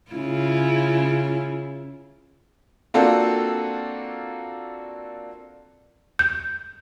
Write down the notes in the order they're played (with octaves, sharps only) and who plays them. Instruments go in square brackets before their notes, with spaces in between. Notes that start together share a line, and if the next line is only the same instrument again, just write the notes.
[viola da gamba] C#3 E4 F4
[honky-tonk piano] A#3 C4 D4 F4 F#4 A4
[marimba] G6